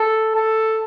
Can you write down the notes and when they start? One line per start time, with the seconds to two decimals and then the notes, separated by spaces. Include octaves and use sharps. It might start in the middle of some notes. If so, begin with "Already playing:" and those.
Already playing: A4
0.35 A4